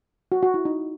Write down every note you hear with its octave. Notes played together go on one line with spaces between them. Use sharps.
F#4
F#4
E4
D#4